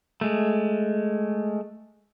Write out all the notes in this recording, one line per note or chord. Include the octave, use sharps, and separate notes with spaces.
G#3 A3